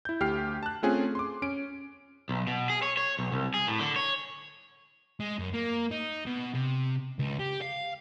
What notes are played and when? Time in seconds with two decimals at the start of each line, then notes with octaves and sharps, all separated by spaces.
0.05 E4 G6
0.20 D2 G4 F6 C7
0.63 A5 F#6
0.83 A3 C4 C#4 F4 G#4
1.15 C6 D6
1.42 C#4 D7
2.29 B1
2.47 B2
2.70 G#4
2.82 C#5
2.97 C#5
3.19 B1
3.32 C2
3.54 G#4
3.68 A2
3.80 D3
3.96 C#5
5.20 G#3
5.39 F#2
5.53 A#3
5.91 D#4
6.26 B2
6.55 C3
7.19 C#2
7.39 G4
7.62 F5